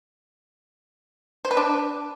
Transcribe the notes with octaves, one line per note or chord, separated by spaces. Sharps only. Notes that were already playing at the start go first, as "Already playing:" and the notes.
C5
B4
D4